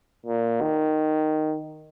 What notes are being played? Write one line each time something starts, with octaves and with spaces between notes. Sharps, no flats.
A#2
D#3